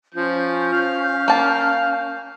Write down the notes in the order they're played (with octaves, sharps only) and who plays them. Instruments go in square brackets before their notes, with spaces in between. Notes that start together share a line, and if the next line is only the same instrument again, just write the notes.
[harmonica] F3 [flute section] C#4 G6
[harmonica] F5
[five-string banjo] A#3 A5